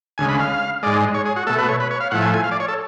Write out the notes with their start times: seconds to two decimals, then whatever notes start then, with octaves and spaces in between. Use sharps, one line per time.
0.18 D2 C#3 G#3 G#5
0.29 B5
0.40 F5
0.83 G#2 G#3 D5
1.14 C#5
1.26 G#4
1.36 F#4
1.47 B2 A3 A4
1.59 B4
1.69 C#5
1.80 B4
1.91 C#5
2.01 F5
2.11 A2 F3 A3 F#5
2.22 G#5
2.34 G#5
2.44 F5
2.51 D5
2.60 C#5
2.68 A4